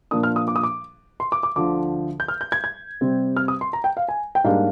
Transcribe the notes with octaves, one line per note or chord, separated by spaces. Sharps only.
A#2 F3 A#3 D4 D#6
F6
D#6
D6
D#6
D6
C6
D6
D6
D2 D3 F3 D6
G6
F6
G6
G#6
G#6
C3 G3 C4
F6
D#6
C6
A#5
G5
F5
G#5
G5
G#2 G3 A#3 D4 F5